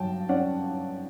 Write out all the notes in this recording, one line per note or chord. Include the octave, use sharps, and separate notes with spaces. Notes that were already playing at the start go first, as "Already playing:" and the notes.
Already playing: G2 F#3 G5 A5
C#4 D5 F#5